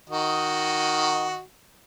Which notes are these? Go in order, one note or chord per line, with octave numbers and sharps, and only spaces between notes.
D#3 F#4 D#5